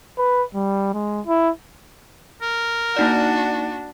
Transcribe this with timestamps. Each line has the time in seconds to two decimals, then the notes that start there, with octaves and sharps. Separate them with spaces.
0.19 B4
0.55 G3
0.94 G#3
1.27 E4
2.42 A#4
2.97 A#3 D4 D#4 F#4 D5